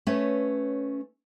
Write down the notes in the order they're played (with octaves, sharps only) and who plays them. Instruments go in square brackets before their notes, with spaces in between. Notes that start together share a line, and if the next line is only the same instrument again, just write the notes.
[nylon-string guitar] A3 C#4 B4 C#5 E5